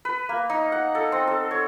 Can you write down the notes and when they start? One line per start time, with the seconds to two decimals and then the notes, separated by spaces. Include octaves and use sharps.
0.05 B4
0.29 A#3
0.50 D#4
0.72 F#5
0.95 A4
1.12 C4
1.27 A4
1.51 C#5